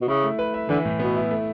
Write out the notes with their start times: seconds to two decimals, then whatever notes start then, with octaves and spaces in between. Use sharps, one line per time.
0.02 B2
0.08 C#3 E4
0.23 A3
0.39 B4
0.54 E5
0.69 D3 E3
0.85 A2
0.99 B2 B3
1.16 E4
1.31 A3